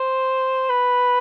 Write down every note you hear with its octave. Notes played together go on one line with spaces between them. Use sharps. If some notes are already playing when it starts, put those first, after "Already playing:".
Already playing: C5
B4